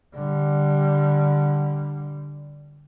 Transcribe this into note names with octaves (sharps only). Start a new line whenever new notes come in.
D3 G3